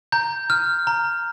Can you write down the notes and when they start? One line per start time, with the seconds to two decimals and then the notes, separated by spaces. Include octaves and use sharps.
0.12 A#5 G6
0.50 F6
0.87 A#5